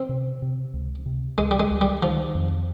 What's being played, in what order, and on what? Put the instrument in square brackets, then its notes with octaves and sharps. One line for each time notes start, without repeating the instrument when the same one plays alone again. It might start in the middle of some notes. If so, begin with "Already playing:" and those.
Already playing: [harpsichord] C4
[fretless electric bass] C3
C3
C#2
C3
[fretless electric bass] C#2 [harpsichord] G#3
[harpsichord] G3
G#3
[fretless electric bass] C#2
[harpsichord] G3
[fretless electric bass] D#3 [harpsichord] F3
[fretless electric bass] F2